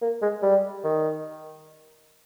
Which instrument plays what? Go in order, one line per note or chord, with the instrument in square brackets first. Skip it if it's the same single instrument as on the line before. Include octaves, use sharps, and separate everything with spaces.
[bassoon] A#3
G#3
G3
D#3